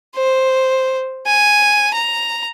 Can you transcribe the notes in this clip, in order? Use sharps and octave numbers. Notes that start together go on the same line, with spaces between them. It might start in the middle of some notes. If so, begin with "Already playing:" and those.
C5
G#5
A#5